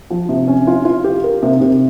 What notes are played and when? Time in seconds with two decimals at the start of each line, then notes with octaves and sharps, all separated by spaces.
0.11 F3
0.29 C3
0.47 C#4
0.67 F4
0.85 F4
1.04 G4
1.24 A#4
1.43 C3
1.61 C3